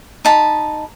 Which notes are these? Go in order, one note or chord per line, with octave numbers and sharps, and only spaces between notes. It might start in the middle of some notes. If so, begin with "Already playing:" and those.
D#4 A5 B5